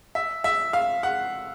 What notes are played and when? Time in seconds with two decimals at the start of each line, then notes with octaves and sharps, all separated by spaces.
0.15 E5
0.44 E5
0.73 F5
1.03 F#5